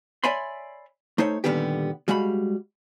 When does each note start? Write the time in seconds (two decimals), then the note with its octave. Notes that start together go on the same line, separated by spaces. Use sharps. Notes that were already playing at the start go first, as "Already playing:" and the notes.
0.24 C#5 D5 E5 G#5 B5 C6
1.18 A3 D#4 C5 C#5
1.44 A#2 D3 D#3 G3 B3 G4
2.08 G3 G#3 F#4 F5 B5